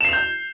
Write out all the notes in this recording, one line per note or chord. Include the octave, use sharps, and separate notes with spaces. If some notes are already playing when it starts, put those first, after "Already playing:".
G6 C7 E7 F7